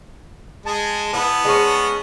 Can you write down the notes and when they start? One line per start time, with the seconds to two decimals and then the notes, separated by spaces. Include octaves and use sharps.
0.66 G#3 G#4 A5
1.13 B3 E4
1.45 G#3 C4 C#4